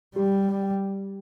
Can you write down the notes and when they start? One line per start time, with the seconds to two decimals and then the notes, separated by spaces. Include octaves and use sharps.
0.16 G3 G4
0.63 G5